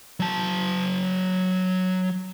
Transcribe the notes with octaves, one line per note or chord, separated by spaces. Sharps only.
F#3 A5